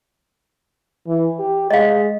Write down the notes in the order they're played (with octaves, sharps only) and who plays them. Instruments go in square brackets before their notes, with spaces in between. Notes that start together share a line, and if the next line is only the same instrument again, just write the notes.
[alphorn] E3
G4
[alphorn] G#3 [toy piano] D#5 F5